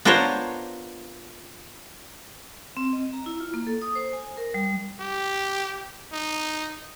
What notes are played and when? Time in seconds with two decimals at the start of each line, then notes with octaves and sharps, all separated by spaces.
0.05 B3 D4 F4 A#4 C5 C#5
2.77 C4
2.93 D#5
3.13 A#5
3.26 E4
3.40 F4
3.54 A#3
3.67 A4
3.82 D#6
3.95 C5
4.13 G#5
4.37 A#4
4.54 G3
5.01 G4
6.13 D#4